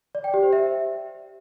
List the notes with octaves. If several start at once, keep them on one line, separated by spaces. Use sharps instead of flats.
D5
G5
G4
C5
E5